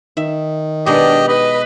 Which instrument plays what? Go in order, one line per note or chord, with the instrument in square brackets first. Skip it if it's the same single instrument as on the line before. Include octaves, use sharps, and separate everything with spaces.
[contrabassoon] D#3 [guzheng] E5
[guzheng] B2 G#3 [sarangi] D4 [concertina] G4 D#5
[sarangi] B4 [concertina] D#5